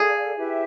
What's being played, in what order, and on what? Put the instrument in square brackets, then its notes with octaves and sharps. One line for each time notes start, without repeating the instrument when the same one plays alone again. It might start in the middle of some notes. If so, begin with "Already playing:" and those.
Already playing: [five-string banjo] G#4 [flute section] A4 D5 F5
[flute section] E4 G4 B4 E5